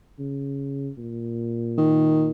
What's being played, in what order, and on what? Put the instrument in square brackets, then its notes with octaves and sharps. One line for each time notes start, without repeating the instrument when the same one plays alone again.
[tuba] C#3
A#2
[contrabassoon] D#3